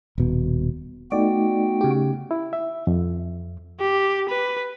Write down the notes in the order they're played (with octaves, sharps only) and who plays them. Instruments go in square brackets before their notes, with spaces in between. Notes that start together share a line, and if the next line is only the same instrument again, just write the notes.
[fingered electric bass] D#1 B2
[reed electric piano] A3 D#4 [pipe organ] B3 F#4 G5 [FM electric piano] D5
[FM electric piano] C#3 G4
[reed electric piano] E4
E5
F2
[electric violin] G4
B4